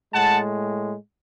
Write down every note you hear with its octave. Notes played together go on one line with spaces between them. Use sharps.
A2 G#3 F#5 A5